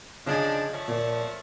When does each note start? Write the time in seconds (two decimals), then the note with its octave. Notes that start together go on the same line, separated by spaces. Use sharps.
0.27 C#3 F3 D4 D#4 G#5
0.72 F3 A3 C#5
0.88 A#2